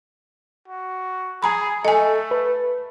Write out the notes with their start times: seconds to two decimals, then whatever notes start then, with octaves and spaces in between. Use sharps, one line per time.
0.68 F#4
1.43 G#4 G#5 A#5 B5
1.85 A3 A4 D#5 G#5
2.31 B4